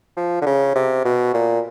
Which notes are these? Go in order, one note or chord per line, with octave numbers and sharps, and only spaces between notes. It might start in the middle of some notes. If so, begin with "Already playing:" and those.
F3
D3
C#3
C3
B2
A#2